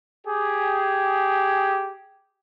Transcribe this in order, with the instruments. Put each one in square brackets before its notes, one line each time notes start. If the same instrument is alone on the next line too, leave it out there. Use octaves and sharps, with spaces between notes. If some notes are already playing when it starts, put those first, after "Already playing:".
[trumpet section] G4 G#4